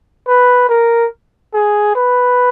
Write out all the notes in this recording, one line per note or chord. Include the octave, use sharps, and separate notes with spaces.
B4
A#4
G#4
B4